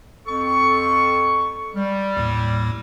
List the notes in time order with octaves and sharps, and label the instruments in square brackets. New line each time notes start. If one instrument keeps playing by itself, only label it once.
[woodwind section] F2 A4 C#6
G3
[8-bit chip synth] D#2 A2